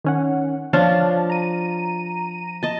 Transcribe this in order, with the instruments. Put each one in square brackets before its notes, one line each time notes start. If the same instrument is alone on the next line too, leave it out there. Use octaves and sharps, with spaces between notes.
[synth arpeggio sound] D#3 C#4 F#5
[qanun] F3 D4 F4 [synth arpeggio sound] C#5 F5 A5
[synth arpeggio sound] A#5 D#7
[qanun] D#5 A5